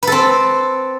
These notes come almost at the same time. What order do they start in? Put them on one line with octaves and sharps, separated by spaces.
B4 A4 C4